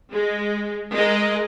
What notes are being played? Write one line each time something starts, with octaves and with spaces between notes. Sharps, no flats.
G#3
G#3 A#4 D#5